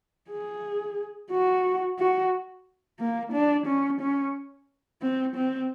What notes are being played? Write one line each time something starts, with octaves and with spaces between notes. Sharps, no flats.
G#4
F#4
F#4
A#3
D4
C#4
C#4
C4
C4